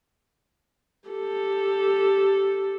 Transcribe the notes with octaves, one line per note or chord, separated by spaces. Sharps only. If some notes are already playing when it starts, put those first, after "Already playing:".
G4 A4